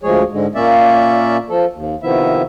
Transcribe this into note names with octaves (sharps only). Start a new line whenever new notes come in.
D2 F3 G#3 G#4 C#5
G#2 D3 G#3
A#2 A#3 C#4 D5 E5
F3 A4
D#2
C3 D#3 F3 B3 E4 E5